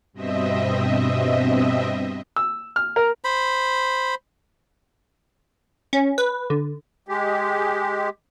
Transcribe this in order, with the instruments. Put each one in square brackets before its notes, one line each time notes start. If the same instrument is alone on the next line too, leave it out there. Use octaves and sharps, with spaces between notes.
[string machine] G2 B2 C4 D#5 E5
[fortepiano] E6
F6
A#4
[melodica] C5 B5
[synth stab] C#4
B4
D3
[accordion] G#3 G4